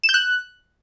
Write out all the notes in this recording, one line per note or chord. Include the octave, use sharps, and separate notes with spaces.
E7
G6
F#6